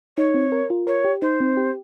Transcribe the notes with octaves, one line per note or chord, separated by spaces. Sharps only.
D#4 C#5
C4
A#4
F4
A#4 C#5
G4
D#4 C5
C4
G4